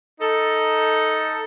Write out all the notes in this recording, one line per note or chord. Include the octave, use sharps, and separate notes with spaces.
D#4 A4